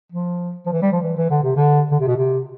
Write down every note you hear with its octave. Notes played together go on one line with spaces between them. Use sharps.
F3
F3
E3
G3
F3
E3
E3
D3
C3
D3
D3
C3
B2
C3